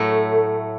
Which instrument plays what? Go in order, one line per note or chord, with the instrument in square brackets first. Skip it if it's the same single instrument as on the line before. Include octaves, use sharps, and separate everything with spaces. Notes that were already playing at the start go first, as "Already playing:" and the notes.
Already playing: [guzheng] A2 F#3 A3